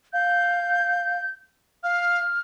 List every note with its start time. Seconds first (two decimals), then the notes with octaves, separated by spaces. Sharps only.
0.13 F5 G6
1.83 F5 F6